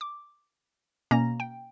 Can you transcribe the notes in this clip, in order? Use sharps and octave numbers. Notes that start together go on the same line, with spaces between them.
D6
B2 A#3 C#4 A#5 A#6
G5